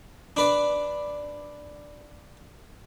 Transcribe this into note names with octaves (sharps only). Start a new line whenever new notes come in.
D4 B4 D5